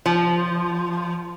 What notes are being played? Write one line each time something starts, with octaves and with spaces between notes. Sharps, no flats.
F3